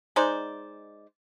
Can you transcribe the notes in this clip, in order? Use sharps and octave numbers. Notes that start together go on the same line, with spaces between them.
G#3 D#4 C5 D5